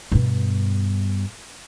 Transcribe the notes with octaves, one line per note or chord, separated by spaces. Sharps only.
G2 B2